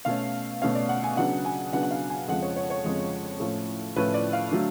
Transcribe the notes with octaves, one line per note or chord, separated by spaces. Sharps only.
B2 A3 C#4 F5
B2 A3 C#4 F5
D5
F#5
G#5
C#3 F#3 B3 D4 F#5
G#5
C#3 F#3 B3 D4 F#5
F#5
F5
G#5
F2 C#3 F3 G#3 F#5
C#5
C#5
C#5
F2 C#3 F3 G#3
A2 F3 A3 C#4
A2 F3 A3 C#4 B4
D5
F5
D3 F#3 A3 D4